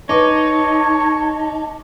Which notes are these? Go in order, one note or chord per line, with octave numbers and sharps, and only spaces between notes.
D#4 B4 C#5 A5 D6